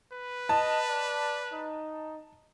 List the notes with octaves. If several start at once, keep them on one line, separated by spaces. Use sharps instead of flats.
B4
D#5 A5
D5
D#4